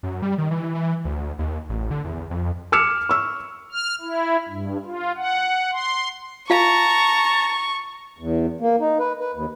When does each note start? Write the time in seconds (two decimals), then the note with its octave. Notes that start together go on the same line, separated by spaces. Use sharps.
0.03 F#2
0.22 G3
0.38 D#3
0.51 E3
0.75 E3
1.05 D2
1.39 D#2
1.69 A1
1.91 D3
2.04 E2
2.30 F2
2.72 D6 E6 F6 C#7 E7
3.09 C#6 E6
3.72 F6
4.01 E4
4.49 G2
4.85 F4
5.17 F#5
5.73 C6
6.50 F4 F5 A5 A#5 C#6
8.18 E2
8.61 A#3
8.80 D#4
8.99 B4
9.20 B4
9.34 D#2